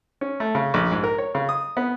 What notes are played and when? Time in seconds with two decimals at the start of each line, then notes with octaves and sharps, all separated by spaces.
0.21 C#4
0.40 A3
0.55 C#3
0.74 A#1
0.91 G#2
1.04 A#4
1.18 C#5
1.35 C#3
1.49 D#6
1.77 B3